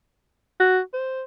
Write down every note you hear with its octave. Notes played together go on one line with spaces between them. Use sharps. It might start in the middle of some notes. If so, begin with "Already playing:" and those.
F#4
C5